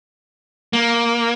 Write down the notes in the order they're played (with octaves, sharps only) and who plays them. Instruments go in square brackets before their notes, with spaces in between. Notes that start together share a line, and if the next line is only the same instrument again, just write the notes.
[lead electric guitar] A#3